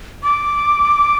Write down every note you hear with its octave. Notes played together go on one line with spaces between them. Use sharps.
D6